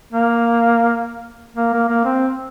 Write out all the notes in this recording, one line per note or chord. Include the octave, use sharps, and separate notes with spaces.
A#3
A#3
A#3
A#3
C4